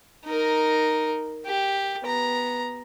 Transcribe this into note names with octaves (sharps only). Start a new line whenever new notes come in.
D#4 A#4
G4
B3 A#5